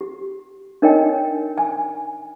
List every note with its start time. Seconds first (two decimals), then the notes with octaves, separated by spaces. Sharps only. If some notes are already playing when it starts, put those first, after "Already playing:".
0.01 G4
0.82 D4 D#4 A#4 C#5 D#5 G5
1.58 G#5